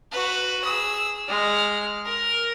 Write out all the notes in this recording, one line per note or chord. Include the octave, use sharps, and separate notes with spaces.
F#4 B4
G#4 E6
G#3 F6
A#4